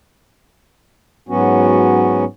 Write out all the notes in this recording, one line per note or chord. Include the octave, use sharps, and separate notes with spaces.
G#2 F#3 B3 C#4 F#4